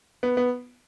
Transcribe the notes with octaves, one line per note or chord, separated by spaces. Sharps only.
B3
B3